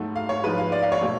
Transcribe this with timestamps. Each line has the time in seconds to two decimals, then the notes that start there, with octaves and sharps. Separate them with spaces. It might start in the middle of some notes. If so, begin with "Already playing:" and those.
Already playing: G#2 F#3 A3
0.16 F5
0.29 C#5
0.43 G#2 F3 G#3 B4
0.58 F5
0.72 D5
0.82 F5
0.92 C#5
1.01 B2 F#3 A3